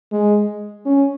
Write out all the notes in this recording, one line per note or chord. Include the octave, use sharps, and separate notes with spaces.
G#3
C#4